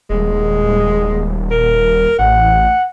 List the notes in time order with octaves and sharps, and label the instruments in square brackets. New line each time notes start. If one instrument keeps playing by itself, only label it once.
[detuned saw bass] D#1 [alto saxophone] G#3
[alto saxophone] A#4
[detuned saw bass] A1 [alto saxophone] F#5